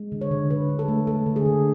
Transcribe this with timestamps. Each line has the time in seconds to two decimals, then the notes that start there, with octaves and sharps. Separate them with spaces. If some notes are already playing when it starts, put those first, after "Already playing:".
Already playing: G#3
0.12 D3
0.21 C#5
0.31 D3
0.50 D3 B4
0.69 D3
0.79 A4
0.88 A3
1.07 A3 A4
1.26 D3
1.36 G#4
1.46 D3